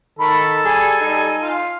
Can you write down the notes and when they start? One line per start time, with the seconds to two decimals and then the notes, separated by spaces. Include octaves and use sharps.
0.19 D#3 A4 B5
0.65 G3 G#4 G#5
1.00 G3 D#4
1.42 F4